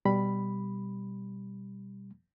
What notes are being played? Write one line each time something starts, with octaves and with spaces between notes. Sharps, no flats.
B2 G3 B5